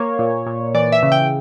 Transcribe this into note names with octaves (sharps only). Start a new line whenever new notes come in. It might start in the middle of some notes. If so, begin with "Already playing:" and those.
Already playing: A#3 C#5
A#2
A#2
E3 D5
E5
C#3
G5